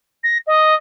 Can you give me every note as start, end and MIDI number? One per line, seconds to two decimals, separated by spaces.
0.24 0.38 94
0.47 0.75 75